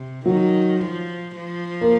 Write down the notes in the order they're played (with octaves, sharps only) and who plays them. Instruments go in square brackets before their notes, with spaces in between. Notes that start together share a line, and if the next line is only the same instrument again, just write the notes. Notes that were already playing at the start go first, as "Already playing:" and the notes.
Already playing: [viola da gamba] C3
[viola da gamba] D#3 [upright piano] F#3
[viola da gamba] F3
F3
[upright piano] A#3